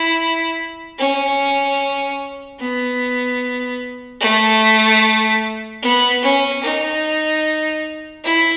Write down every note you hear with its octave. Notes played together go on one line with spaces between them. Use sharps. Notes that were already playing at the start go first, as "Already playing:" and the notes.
Already playing: E4
C#4
B3
A3
B3
C#4
D#4
E4